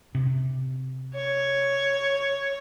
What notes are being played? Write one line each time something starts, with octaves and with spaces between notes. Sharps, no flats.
C3
C#5